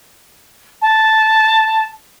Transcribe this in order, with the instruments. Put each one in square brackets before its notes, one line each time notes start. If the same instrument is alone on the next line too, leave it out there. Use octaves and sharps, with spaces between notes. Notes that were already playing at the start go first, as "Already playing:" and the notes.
[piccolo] A5